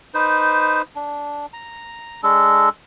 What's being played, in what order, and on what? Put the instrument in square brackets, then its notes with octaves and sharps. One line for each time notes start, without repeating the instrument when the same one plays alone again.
[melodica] D#4 B4 C5
D4
A#5
G#3 D4 A4